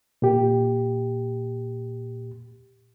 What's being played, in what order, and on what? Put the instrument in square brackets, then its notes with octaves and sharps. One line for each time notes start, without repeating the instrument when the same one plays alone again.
[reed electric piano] A#2 G4